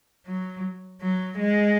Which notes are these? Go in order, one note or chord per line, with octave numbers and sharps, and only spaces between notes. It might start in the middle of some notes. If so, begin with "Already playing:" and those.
F#3
F#3
G#3